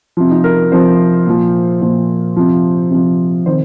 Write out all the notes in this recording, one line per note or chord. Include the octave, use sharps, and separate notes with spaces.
C3 F3
D#4
A#4
C3 F3 C5
A#2 F3
A#2 F3 C5
C3 F3
C3 F3
C3 D#3 C5